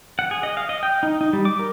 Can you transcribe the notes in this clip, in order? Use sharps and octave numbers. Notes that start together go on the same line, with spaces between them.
F#5
G#4
D#5
F5
D#5
G5
D#4
D#4
G3
D6
A#4